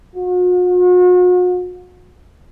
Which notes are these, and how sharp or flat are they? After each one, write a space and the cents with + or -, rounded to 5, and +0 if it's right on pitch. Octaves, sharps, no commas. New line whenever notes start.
F#4 -45